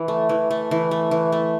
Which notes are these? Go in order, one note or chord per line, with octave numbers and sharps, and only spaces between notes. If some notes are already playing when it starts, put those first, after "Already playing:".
Already playing: E3
A3
E3
A3
E3
A3
E3
A3